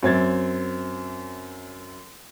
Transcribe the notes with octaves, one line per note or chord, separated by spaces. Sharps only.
F#2 C4 G#6 A6